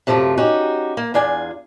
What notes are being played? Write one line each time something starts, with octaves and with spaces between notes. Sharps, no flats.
F#2 C3 F3 G3 A3 F4
C#4 D#4 F#4 G4
A#3
E2 D4 F4 G#5